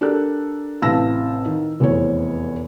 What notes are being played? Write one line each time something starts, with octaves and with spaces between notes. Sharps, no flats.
D4 G4 A4 A#4 D5 F#6
A1 C3 F5 A5 E6 A#6
D#3
F1 E2 B3 C5 C#5